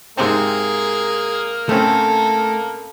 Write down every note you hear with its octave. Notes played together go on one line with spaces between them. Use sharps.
G#2 C3 A#3 C4 G#4 A#4
A2 A3 C4 C#4 A4